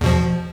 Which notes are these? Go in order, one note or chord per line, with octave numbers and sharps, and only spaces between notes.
E2 B2 F3